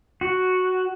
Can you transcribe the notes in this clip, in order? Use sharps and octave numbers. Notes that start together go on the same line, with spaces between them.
F#4